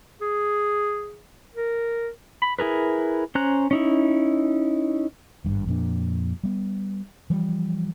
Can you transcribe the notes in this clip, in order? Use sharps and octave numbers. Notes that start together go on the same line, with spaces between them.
G#4
A#4
B5
E4 G#4 A#4 B4
C#4 C5 A#5 F#6
C#4 D#4 E4
G#1 G2
F2 A#2 D4
G3 B3
E3 F3 G3